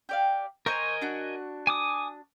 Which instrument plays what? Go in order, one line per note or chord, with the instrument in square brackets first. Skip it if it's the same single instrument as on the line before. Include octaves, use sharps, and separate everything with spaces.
[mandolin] G4 D5 F5
[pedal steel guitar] A#4 D#5 G#5 [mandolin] C5 A#5 C#6
[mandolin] D4 F#4
[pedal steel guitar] G#5 D6 D#6